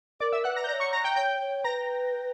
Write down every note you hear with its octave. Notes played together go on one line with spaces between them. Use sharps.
A#4 D5 D6
E5 E6
B4 F#5 F#6
A#5 A#6
G6
C#5 D5 A#5 A#6
C#6 C#7
A#5 A#6
G5 G6
C#5 G5 G6
C#5
B4 A#5 A#6